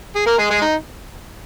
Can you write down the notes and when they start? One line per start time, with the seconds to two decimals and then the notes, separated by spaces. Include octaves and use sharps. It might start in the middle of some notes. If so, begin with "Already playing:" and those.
0.16 G#4
0.26 A#3 A#4
0.38 G#3 G#4
0.50 G#3 G#4
0.62 D#4